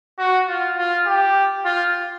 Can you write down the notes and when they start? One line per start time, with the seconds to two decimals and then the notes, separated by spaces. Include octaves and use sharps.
0.19 F#4
0.49 F4
0.78 F4
1.07 G4
1.65 F4